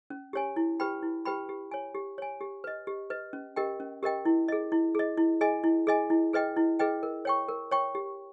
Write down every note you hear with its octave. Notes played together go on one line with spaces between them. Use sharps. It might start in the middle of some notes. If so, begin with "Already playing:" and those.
C#4
G4 C#5 G#5
E4
G4 B4 G5 B5
E4
G4 B4 G5 B5
G4
C#5 G#5
G4
C#5 G#5
G4
B4 D#5
G4
B4 D#5
C#4
G4 A#4 D#5 G5
C#4
G4 A#4 D#5 G5
E4
G#4 D#5
E4
G#4 D#5
E4
G#4 D#5 G#5
E4
G#4 D#5 G#5
E4
G#4 B4 D#5 G5
E4
G#4 B4 D#5 G5
A#4
C#5 G5 C#6
A#4
C#5 G5 C#6
G4